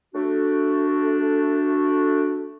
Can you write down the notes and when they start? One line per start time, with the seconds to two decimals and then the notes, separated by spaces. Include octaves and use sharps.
0.15 A3 D4 F#4